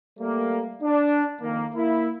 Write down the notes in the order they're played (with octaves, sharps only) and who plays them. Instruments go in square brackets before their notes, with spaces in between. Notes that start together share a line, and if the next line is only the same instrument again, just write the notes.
[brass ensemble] G3 A3 A#3
D4
F2 D#3 A#3
A#3 E4